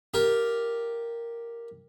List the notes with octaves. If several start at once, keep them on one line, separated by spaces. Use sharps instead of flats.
F4 G4 A#4